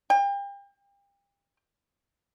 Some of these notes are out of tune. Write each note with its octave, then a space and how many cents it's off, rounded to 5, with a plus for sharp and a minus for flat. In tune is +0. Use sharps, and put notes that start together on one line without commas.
G5 +35